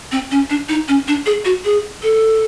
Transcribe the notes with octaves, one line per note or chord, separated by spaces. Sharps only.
C4
C#4
D4
D#4
C#4
D4
G#4
F#4
G#4
A4